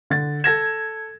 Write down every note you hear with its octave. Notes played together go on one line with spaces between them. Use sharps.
D3 A6
A4 G#6 A#6 E7